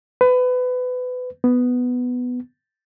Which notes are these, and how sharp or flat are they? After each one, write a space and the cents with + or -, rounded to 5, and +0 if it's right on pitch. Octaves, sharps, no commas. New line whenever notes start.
B4 +25
B3 +5